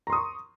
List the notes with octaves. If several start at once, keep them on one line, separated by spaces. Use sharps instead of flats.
A#5 C6 C#6 D#6